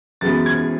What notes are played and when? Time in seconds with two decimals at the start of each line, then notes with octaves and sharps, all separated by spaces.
0.21 F#2 E3 G#3 B3 A6
0.46 G#6